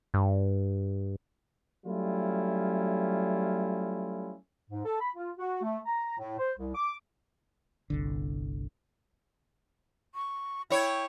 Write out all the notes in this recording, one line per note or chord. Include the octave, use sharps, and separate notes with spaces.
G2
F#3 G3 A3 C#4 E4 F4
G#2
A4
B5
F4
F#4
A3
A#5
A2
C5
C2
D6
G1 C2 D3
C#6
E4 C#5 G5